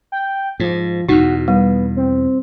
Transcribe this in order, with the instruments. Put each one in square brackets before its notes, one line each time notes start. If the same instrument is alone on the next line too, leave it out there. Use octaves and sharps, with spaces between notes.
[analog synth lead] G5
[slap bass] G#2 [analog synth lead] F3
[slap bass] E2 B2 [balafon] D#4 [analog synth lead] F#4
[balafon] G3 [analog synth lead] B3
[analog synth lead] C4